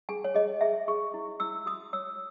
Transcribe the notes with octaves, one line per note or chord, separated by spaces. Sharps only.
G#4 G#5
C#5
G#4 D#5
G#4 E5
G#4 C#6
E4
E4 E6
F#4 D#6
C#5 E6